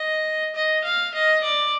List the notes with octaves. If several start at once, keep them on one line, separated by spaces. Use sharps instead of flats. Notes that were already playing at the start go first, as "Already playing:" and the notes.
Already playing: D#5
D#5
F5
D#5
D5